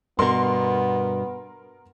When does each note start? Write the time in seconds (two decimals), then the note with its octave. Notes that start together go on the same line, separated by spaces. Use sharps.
0.19 G2 B2 B3 A#4 C6